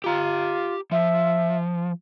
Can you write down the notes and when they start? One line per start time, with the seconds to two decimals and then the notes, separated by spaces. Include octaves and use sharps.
0.04 F4 G4 A#5
0.91 F3 E5